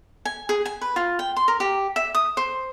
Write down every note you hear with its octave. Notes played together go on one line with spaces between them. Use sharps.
G#5
G#4
G#5
B4
F4
G5
C6
A#4
G4
E5
D#6
C5